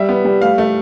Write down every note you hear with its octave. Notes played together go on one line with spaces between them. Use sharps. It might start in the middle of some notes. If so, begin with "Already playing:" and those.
Already playing: G3 E5
B3
G3
A3 F5
A3